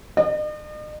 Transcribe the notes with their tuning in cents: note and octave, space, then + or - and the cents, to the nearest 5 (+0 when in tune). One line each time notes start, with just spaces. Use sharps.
D#5 -45